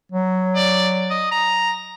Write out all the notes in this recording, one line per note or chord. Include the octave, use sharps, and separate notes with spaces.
F#3
D5
D#5
A#5